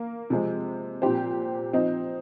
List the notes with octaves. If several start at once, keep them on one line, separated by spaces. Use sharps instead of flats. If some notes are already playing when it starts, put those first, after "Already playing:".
Already playing: A#3
C3 F3 G#3 C4
A#2 F3 C4 G4 C5
F3 C4 D#4